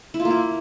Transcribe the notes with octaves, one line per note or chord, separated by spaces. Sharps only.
E4
F4
A#3
E4